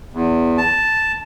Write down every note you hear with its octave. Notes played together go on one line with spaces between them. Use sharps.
E2
A5